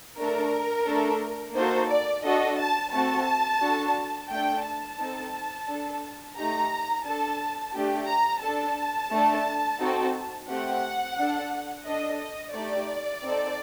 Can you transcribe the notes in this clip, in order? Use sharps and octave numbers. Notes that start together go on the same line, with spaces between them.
A3 D4 A4 A#4
A3 D4 A4
A#3 D#4 F#4 A4 C5
D5
D4 F#4 A4 D#5
A5
A3 C4 F#4 A4 A5
D4 F#4 A4
A3 D4 A4 G5
A5
C4 D#4 A4
D4 A4
A3 D#4 G4 A#5
D4 A4 A5
A3 D4 G4
A#5
D4 A4 A5
A3 D4 A4
C4 D#4 F#4 A4
A3 C4 G4 F#5
D4 A4
D4 A4 D#5
D#5
A3 D#4 G4 D5
C4 D#4 A4